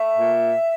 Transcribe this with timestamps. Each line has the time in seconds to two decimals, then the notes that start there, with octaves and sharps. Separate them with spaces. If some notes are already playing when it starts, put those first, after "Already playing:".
Already playing: A3 E5
0.16 A#2